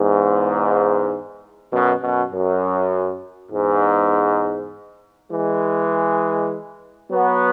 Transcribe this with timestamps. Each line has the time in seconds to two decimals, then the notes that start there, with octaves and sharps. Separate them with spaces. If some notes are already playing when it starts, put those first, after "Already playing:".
Already playing: E2 G#2
1.72 F#2 B2
2.02 F#2 B2
2.32 F#2
3.51 E2 G#2
5.31 E3 G#3
7.11 F#3 B3